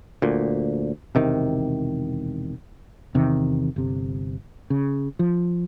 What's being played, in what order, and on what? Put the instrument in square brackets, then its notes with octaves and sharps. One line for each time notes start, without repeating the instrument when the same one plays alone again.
[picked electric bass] D2 A#2
E1 C3 D#3
[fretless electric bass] E2 C3 D#3
G1 C3
C#3
F3